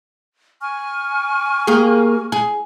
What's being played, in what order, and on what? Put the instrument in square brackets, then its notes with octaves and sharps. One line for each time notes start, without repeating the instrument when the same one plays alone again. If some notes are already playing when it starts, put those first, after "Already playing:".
[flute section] G#5 C#6 F6
[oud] A#3 G4 G#4
G#4